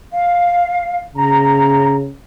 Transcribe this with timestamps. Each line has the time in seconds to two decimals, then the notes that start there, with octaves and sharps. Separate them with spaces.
0.12 F5
1.15 C#3 A#5